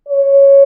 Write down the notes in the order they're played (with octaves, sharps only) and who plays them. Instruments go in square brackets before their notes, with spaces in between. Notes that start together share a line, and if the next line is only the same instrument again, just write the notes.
[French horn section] C#5